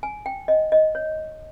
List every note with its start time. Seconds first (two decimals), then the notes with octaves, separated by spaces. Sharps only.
0.03 G#5
0.26 G5
0.48 D#5
0.72 D#5
0.95 C#5